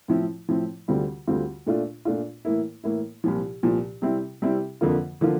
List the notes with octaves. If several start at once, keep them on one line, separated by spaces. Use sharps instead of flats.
A2 F3 C4 E4
A2 F3 C4 E4
D2 D3 G3 C4 F4
D2 D3 G3 C4 F4
A#2 A3 D4 F4
A#2 A3 D4 F4
A2 E3 A#3 E4
A2 E3 A#3 E4
C2 A#2 F3
C2 A#2 F3
C3 G3 C4 E4
C3 G3 C4 E4
F2 D3 F3 A#3 F4
D3 F3 A#3 F4